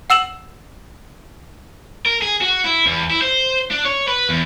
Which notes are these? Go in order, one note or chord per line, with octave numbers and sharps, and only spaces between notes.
F#5 E6 E7 F#7
A#4
G#4
F#4
E4
E2
E4
C5
D4
C#5
B4
E2